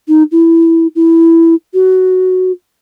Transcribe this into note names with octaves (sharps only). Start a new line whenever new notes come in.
D#4
E4
E4
F#4